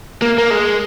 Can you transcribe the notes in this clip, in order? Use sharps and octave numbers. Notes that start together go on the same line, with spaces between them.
A#3
A#3
G#3